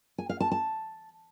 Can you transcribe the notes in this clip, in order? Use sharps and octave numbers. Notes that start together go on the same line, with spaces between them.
G#5
F5
A5
A5